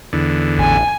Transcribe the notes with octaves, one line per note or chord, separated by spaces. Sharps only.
E2 D3
A1 G#5